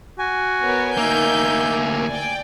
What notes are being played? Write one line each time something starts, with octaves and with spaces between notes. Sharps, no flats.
F#4 G#5
B3 A#4 C#5
D2 A#3 D#4 E5 G6
D5 G5